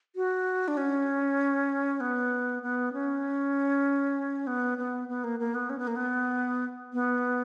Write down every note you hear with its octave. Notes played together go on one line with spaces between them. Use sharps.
F#4
D4
C#4
B3
B3
C#4
B3
B3
B3
A#3
A#3
B3
C#4
B3
A#3
B3
B3